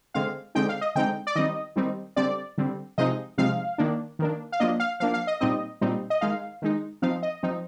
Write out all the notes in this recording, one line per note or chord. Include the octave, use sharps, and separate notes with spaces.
D3 G#3 C4 F5
D3 G#3 C4 D#4 G5
F5
D#5
D3 G#3 C4 D#4 G5
D5
D#3 G3 C4 D#4 D#5
D#3 G3 C4 D#4
D3 G3 C4 D5
D3 G3 C4
C3 F3 G#3 C4 D#4 D#5
C3 F3 G#3 C4 D#4 F5
D#3 A#3 D4
D#3 A#3 D4
F5
F3 A#3 D4 D#5
F5
F3 A#3 D4 F5
F5
D#5
A#2 G3 C4 D#4 D#5
A#2 G3 C4 D#4
D#5
D#3 G#3 D#4 F5
D#3 G#3 D#4
F3 C4 D#4 F5
D#5
F3 C4 D#4